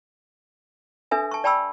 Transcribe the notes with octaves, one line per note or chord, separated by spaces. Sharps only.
D4 A4 B4 E5 G#5
A5 C#6
D5 G5 A5 B5 C#6 E6